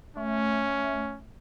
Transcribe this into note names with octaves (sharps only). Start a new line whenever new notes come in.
A3 C#4